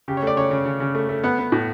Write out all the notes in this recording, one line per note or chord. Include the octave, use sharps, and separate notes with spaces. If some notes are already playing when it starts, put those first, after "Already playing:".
C#3 G4
C#5
A3 D5
C#3 C#5
C#3
C#3
C#3
A3
A3
B3 F#5
B3
A2